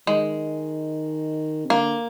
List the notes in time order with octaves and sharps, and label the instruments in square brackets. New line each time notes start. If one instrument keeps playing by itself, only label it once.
[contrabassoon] D#3 [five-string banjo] G#3
[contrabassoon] C3
[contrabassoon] D3 [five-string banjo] A#3